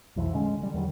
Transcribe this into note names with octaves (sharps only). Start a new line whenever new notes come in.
B1 F2 E3
A#2 D3 G#3 C#4
D3 G3
E2 D#3 F#3 G3